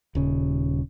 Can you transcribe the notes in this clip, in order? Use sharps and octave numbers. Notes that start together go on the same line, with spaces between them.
D#1 C#3